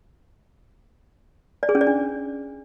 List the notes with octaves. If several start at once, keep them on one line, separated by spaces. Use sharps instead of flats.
D5
G#4
C#4
D5
D4